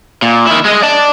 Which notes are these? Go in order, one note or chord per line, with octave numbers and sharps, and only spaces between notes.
A#2
D#3 E4
G#3 D#5
D5 A5